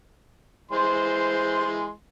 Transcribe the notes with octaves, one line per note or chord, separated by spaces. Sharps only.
E3 G#3 C5 C6